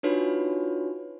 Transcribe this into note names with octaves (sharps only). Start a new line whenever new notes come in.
D4 D#4 F4 F#4 B4 C#5